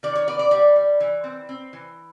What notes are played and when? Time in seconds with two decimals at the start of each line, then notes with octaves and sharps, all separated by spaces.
0.03 D#3 D5
0.15 C#5
0.28 B3 D5
0.39 D5
0.51 G3 D5
0.76 G3
1.00 E3
1.24 C4
1.49 C4
1.73 E3